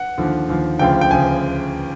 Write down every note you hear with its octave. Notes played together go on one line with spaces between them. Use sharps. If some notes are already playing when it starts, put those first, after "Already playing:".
Already playing: F#5
D#2 D3 F3
D#2 D3 F3
D2 C#3 F3 G5
G5
D2 C#3 F3 G#5